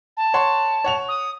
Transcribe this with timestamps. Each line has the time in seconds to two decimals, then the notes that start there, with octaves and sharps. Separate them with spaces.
0.17 A5
0.34 C#5 F#5 C6
0.84 C#5 F#5 F7
1.08 D#6